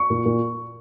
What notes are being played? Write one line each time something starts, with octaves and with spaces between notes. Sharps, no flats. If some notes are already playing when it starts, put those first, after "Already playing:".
Already playing: C#6
A#2
A#2